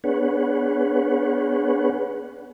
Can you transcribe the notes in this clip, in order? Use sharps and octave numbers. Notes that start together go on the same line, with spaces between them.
B3 D4 G#4 B4 C#5 F#5